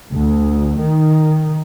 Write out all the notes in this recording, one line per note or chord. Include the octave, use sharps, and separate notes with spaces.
D2
D#3